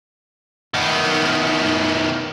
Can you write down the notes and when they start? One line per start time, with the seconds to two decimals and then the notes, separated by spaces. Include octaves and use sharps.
0.74 D#3 B3